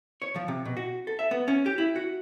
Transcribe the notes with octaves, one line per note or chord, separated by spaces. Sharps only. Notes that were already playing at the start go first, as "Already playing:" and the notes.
C#5
F3
C3
B2
F#4
A4
E5
B3
C#4
G4
E4
F#4